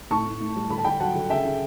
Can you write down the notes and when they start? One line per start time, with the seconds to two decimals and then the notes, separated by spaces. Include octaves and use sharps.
0.10 A2 A5 C#6
0.26 A2
0.40 A2
0.56 G3
0.70 D3 B5
0.78 A5
0.84 D3 G5 B5
1.00 F#3 F#5 A5
1.15 D3
1.30 C#3 E5 G5
1.45 C#3